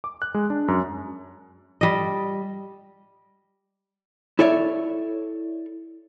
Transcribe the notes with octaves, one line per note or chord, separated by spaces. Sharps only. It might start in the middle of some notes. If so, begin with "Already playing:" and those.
D6
F#6
G#3
D4
F#2
G3 D#5
E4 A4 C#5 D5 E5